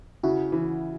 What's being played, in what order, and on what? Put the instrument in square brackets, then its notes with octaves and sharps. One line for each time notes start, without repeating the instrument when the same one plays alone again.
[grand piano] C#3 [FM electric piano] E4 F#4
[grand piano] E3